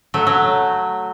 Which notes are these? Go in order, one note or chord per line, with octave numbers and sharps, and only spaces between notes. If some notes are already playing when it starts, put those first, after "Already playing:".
F#3 A3
F#3